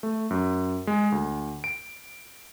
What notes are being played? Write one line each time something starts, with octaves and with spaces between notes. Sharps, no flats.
A3
F#2
G#3
D2
D7